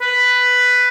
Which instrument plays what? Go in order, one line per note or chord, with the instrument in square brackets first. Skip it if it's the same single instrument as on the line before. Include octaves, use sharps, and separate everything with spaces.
[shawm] B4